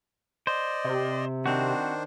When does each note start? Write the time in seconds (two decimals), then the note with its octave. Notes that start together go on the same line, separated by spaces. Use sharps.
0.47 C5 D5 D#5
0.84 C3
1.46 D#3 C4 D4 F#4 C5